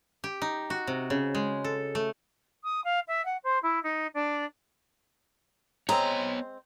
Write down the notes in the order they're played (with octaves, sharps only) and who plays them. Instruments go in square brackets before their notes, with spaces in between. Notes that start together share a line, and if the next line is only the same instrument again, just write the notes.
[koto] G4
D#4
F#4
C3
C#3
G#3
A4
A3
[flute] D#6
F5
E5
F#5
C5
E4
D#4
D4
[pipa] G#3 C4 [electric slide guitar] B3 C#5 [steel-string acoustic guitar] A#5